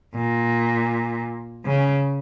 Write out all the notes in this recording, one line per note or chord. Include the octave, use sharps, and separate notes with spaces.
A#2
C#3